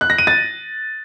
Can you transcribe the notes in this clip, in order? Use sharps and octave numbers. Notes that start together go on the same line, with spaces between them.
F#6
A#6
D#7
A6